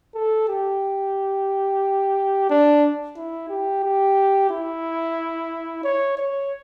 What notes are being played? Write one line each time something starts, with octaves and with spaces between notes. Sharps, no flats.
A4
G4
D4
E4
G4
G4
E4
C#5
C#5